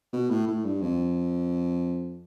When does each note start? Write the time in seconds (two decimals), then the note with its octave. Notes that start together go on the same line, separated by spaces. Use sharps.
0.13 B2
0.30 A2
0.48 A2
0.65 G2
0.82 F2